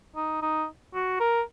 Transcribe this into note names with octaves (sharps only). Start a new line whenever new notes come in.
D#4
D#4
F#4
A#4